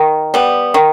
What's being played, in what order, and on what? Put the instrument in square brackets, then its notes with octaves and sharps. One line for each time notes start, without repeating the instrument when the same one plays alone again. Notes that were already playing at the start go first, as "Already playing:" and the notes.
Already playing: [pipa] D#3
G3 B3
D#3